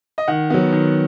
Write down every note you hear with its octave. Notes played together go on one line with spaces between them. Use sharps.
D#5
D#3 F#5
F#3 B3
D#3